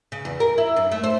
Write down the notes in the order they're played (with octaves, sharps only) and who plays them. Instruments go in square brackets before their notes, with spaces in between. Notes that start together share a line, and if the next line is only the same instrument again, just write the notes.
[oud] C#3
E2
A#4
E4
F#2
A3
C5